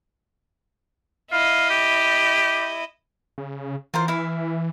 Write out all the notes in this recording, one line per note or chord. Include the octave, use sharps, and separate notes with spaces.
E4 D#5 F5
G4
C#3
E3 F4 A#4 C5
E4 E5 F5